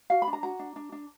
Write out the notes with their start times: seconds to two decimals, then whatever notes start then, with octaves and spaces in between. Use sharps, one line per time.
0.10 F#4 F5
0.22 B5
0.27 D4
0.33 A#5
0.43 F#4 A#5
0.59 D4
0.76 D4
0.92 D4